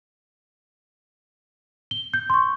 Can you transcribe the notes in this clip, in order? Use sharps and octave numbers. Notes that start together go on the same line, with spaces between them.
G7
G6
C6 C#6